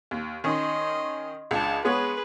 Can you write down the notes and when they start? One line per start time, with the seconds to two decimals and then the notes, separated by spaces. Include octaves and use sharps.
0.11 D#2
0.44 D#3 C#4 D#5 C6
1.51 C#2 D4 A5
1.85 G#3 B3 G#4 B4 C#5